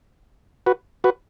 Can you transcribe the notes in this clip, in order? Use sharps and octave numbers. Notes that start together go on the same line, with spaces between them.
F#4 B4
F#4 B4